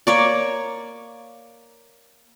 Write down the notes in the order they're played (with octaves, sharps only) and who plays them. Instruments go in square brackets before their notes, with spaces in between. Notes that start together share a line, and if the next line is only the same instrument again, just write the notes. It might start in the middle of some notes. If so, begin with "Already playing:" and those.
[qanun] A#3 C#5 D5